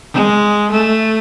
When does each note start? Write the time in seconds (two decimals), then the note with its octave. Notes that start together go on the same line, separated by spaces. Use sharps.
0.13 G#3
0.71 A3